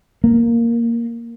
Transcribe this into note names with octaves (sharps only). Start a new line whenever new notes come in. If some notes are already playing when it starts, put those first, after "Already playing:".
A#3